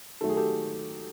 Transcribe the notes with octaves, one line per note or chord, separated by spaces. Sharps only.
D#3 F#3 A3 A4
G#4
G4 A4